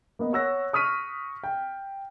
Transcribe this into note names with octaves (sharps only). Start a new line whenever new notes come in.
A#3 B3 D#5
C#5 F#5 E6 F#6 A#6
C#6 D#6 F6 B6 D#7
G5